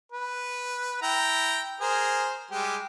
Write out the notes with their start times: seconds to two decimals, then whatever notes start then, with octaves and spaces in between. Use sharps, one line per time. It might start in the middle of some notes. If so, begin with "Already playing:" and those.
0.12 B4
1.02 E4 G5 A#5
1.81 G#4 A#4 C5
2.51 G3 G#3 G4